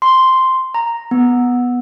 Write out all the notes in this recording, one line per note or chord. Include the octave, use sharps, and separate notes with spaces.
C6
A#5
B3